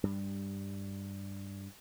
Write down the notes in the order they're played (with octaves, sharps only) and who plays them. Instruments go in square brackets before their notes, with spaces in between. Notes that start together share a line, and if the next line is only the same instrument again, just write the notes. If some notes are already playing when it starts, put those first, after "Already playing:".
[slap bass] G2 G3